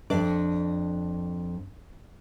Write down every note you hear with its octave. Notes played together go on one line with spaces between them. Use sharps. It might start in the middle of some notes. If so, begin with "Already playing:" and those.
F2 D4 D5